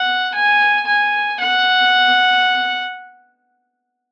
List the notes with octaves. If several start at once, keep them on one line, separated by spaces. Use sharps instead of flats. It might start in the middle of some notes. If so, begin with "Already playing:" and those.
Already playing: F#5
G#5
G#5
F#5